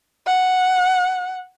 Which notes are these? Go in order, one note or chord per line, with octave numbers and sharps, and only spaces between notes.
F#5